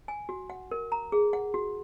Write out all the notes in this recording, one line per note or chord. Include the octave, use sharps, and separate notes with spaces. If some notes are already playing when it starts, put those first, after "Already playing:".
G#5
F#4
F#5
A#4
A#5
G#4
F#5
F#4